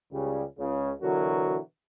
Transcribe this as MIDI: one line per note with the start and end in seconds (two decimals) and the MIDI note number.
0.12 0.43 37
0.12 0.43 49
0.12 0.43 55
0.59 0.91 37
0.59 0.91 49
1.02 1.58 47
1.02 1.58 50
1.02 1.58 52
1.02 1.58 54
1.02 1.58 66
1.02 1.58 70